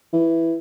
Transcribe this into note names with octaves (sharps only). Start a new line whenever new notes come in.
E3